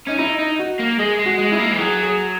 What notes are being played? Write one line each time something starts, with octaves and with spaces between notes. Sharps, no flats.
C#4 D#4
D#4 E4
D#4
F#4
A#3
G#3 G#4
G#3
F#4
G#3
E4
A#3
E3
F#3 G#4
G#4